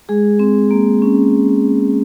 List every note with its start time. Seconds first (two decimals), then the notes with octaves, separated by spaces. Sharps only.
0.09 G#3 G#4
0.39 C4
0.71 A#3
1.02 C#4